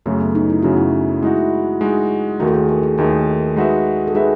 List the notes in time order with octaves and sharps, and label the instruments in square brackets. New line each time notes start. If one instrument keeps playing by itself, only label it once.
[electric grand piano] F#2 C#3 F#3 [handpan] A3
[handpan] B3
D#4
E4
[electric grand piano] F#2 C#3 F#3 [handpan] F#4
[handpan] E4
[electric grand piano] G#3 D#4 F#4 [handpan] E4
[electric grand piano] G#3 D#4 F#4
[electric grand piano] D#2 D#3 A3 D#4 [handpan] F#4
[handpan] A4
G#4
A4
G#4
[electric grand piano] D#2 D#3 A3 D#4 [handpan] G#4
[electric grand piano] G#3 D#4 F#4 B4 E5
[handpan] A4
[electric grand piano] G#3 D#4 F#4 B4 E5 [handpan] G#4